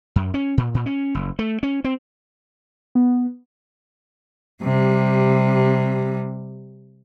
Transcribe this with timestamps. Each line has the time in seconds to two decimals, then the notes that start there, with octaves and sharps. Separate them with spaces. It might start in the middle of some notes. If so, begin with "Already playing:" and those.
0.16 F#2
0.34 C#4
0.57 A#2
0.74 A#2
0.86 C#4
1.15 F#1
1.39 A3
1.63 C#4
1.84 C4
2.95 B3
4.63 C3 G3